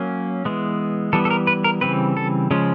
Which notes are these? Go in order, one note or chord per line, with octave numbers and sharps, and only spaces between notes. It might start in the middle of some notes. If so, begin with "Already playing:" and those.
Already playing: F#3 A#3 C#4
E3 G#3 B3
E3 G3 B3 A4
A4
A#4
B4
A#4
C#3 E3 G3 C4 B4
A4
C#3 F3 G#3 C#4